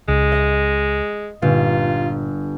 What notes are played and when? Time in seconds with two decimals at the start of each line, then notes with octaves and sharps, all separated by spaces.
0.08 C#2 G#3
0.32 D#5
1.42 G1 A#2 F4